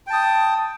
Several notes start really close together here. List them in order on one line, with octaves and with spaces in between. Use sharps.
G5 A5 D#6